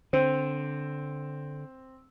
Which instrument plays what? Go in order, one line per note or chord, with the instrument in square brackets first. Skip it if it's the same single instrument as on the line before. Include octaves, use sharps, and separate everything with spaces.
[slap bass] D3 [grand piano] C4